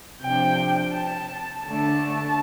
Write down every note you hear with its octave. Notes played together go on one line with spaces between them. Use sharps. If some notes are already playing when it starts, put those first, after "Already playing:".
C3 F3 D4 G5
A5
D3 A3 D4 A5